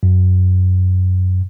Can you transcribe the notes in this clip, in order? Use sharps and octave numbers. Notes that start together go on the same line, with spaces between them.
F#2